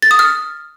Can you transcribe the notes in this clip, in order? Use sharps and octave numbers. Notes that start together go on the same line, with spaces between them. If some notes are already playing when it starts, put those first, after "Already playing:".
A6
D#6
F6